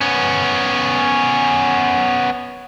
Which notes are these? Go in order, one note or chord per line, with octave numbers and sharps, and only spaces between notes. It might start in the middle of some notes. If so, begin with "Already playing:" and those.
B3 C#4